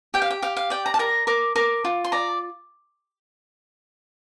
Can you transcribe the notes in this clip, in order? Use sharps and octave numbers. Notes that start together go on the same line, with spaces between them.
G4 G5
F5
G5
G4 F5
F5
D5 G5
A#5
A5
A#4 A#5
A#4 D6
A#4 D6
F4
C6
D5 A#5